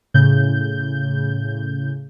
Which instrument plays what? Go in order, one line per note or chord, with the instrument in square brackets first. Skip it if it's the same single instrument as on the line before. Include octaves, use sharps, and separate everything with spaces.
[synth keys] A2 C#3 G6